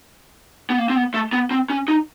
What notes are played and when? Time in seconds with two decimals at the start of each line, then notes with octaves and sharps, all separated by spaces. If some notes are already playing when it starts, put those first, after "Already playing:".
0.70 B3
0.78 A#3
0.90 C4
0.96 B3
1.14 A3
1.33 B3
1.51 C4
1.70 C#4
1.88 D#4